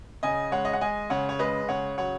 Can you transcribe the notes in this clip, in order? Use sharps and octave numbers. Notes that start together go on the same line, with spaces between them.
C#3 D#5 G#5
G#3 C#5 F#5
D#5
F#5
G#3 D#5 G#5
C#3 C#5 F#5
C#5
G#3 B4 D#5
C#3 C#5 F#5
F#3 C#5 F#5